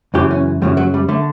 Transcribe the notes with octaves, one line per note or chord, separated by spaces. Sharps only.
F#2 C#3 E3 G4
C#4
F#2 C#3 E3 G3
F#3
G3
D3 A3